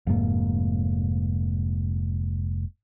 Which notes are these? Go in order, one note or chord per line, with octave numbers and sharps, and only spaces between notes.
F1 G#2 A#3